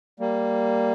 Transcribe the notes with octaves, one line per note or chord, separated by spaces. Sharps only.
G3 A#3